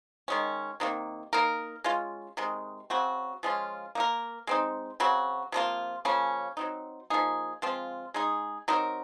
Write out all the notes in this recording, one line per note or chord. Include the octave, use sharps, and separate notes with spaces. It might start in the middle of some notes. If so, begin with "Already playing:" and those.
D#3 G#3 C#4
C3 D#3 A#3
A#3 D#4 A#4
G#3 C#4 F4
C3 D#3 G#3
C#3 F#3 C4 F#4
F3 G#3 C#4 F4
A#3 D#4 A#4
G#3 C4 D#4
C#3 F#3 C4 F#4
C3 F3 A#3 F4
C#3 F3 A#3 C#4
F#3 C4 D#4
F3 A#3 D#4 G#4
F3 G#3 C4 F4
G#3 D#4 G#4
F#3 C4 D#4 A#4